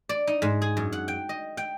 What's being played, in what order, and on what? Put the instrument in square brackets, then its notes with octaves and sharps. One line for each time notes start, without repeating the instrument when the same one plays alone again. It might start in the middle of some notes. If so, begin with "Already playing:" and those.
[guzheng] D5
D#4
G#2
G#4
F#2
F#5
G5
D#5
G5